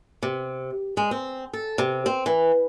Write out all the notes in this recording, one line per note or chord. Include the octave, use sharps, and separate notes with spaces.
C3
G#3
C4
A4
C3
C4
E3